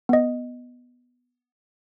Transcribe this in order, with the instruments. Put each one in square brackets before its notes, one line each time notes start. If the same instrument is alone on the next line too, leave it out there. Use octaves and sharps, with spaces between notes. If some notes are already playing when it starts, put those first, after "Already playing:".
[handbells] B3 D#5